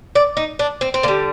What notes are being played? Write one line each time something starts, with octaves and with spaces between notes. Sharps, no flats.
D5
D#4
D4
C4
C4
D3 G3 A#3